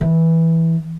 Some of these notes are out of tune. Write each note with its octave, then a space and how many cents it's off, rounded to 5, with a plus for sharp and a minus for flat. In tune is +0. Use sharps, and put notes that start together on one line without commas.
E3 -10